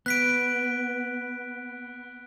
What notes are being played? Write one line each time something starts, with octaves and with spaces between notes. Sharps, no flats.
B3 F#6 B6 D7